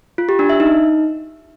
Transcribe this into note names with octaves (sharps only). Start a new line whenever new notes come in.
F4
G4
D4
E5
D#4